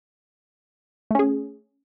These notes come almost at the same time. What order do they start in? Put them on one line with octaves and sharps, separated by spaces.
A3 C#4 G#4